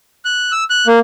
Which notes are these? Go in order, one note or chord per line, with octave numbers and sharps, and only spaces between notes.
F#6
E6
F#6
A#3